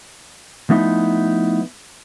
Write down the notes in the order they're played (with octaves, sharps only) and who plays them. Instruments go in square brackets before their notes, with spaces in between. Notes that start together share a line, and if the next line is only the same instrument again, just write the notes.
[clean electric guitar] F3 A3 B3 D#4 E4